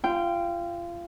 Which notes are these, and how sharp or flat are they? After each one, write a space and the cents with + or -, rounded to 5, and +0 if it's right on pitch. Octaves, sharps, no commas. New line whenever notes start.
F4 -25 G5 +0